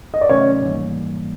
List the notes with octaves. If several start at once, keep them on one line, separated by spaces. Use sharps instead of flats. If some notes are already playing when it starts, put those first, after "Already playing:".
D#5
D5
C3 D#3 F#3 A3 C#4 C#5
G#2 E3 G3 A#3